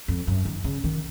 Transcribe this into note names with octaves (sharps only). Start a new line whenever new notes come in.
F2
F#2
D#3
C#3
D#3